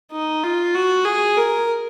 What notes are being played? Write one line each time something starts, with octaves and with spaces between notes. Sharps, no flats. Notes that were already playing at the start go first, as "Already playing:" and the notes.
D#4
F4
F#4
G#4
A#4